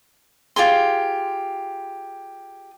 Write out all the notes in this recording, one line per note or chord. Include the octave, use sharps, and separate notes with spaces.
F4 G4 G#4 C6